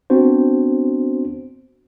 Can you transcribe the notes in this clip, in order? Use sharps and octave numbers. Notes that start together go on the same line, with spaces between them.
B3 C4 D4 F#4 C5